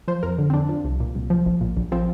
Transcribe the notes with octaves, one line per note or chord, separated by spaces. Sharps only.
F3 C5
F2 A#4
D3
C4
F2 D4
F3
C2
A#2
C2
F3
A#1
A#2
A#1
F3 C4